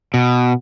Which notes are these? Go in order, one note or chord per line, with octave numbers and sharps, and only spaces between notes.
B2